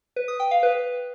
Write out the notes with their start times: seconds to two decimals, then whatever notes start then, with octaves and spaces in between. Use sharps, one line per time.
0.16 B4
0.28 D#6
0.40 G5
0.51 F5
0.63 B4